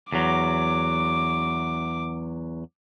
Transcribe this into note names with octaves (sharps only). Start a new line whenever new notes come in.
E2 F#3 D6